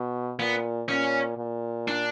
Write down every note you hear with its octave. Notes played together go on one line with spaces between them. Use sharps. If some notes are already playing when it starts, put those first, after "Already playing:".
Already playing: B2
A#2 B3
A#2 C#4
A#2
D4